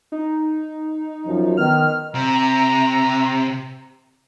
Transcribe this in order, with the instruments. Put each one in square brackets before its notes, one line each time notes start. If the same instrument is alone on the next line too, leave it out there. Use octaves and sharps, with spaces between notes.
[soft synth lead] D#4
[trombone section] F#2 F3
[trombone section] D#3 B3 [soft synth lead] F6
[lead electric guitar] C3 [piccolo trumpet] A#5